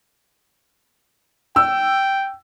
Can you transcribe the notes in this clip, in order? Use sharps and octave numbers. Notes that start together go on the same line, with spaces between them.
G5 E6